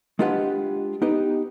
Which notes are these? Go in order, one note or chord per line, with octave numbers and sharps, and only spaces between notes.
G#3 D4 F4 G4 B4 F#5
B3 D#4 G4 B4